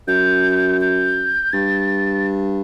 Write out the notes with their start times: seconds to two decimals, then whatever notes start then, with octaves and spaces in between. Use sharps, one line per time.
0.08 F#2 G6
0.81 G6
1.53 G2 A6